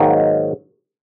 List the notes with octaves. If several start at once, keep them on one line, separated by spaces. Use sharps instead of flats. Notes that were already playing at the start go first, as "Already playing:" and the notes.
Already playing: G#2 D#3 F#3 A#3